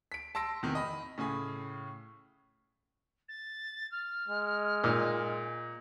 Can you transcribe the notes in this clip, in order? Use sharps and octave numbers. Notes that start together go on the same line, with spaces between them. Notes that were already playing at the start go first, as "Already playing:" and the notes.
B6 D7
A5 C6 E6 A#6 D7
E2 C3 D#3
D#5 B5
A2 C#3 G#5 B5 D#6
A6
F6
G#3
A#2 D#4 E6